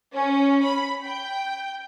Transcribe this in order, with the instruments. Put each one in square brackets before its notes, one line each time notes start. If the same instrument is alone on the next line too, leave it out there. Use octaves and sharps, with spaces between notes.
[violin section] C#4
B5
G5